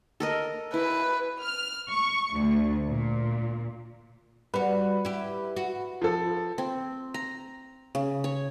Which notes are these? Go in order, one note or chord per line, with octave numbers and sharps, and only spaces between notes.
A4 A#4 D#5
E4 B4
F6
C#6
D2
A#2
G3 F#4 B4
E4 G4
F#4
F3 A4
C4
A#5
C#3
C#5